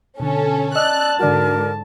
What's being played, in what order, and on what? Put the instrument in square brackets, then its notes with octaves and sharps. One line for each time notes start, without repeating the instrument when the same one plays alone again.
[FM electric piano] B2 D3 [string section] C#4 A4
[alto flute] D5 [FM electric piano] D#5 E6 [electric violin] A5 [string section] F#6
[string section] G#2 D3 [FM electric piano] F#4 D5 [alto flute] A#4